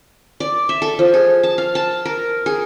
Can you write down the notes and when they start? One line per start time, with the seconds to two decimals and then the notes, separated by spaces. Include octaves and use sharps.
0.40 D5
0.69 E5
0.82 A4
0.99 F3
1.14 G#4
1.43 A5
1.58 F5
1.75 A5
2.05 A#4
2.46 G#4